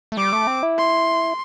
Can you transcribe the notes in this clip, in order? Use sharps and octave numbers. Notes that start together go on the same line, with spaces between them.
A3
G3 D6
A3
C4
E4
C6